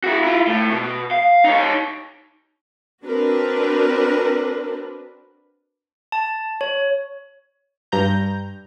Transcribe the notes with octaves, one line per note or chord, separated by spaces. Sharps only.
E4 F#4
E4 F4
A2
B2
F5
D#4 C#5
C4 D4 F#4 A#4 B4
A5
C#5
G2 A#5 G6